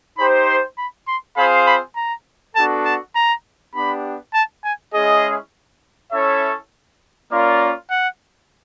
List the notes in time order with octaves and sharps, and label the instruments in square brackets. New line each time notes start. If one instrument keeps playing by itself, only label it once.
[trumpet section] D#4 G4 C5 [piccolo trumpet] B5
[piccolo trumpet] C6
B5
C6
[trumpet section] C4 F4 G#4 C5 F5 [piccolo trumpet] B5
[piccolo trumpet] B5
A#5
[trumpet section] B3 D4 F#4 A4 [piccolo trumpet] A5
[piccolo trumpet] A5
A#5
[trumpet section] B3 D4 G4 [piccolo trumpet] B5
[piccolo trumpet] A5
G#5
[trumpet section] G#3 C#4 E4 G#4 [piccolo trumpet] D#5
[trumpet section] C#4 E4 A4 C#5 E5
A#3 C#4 F4 A#4 D5
[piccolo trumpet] F#5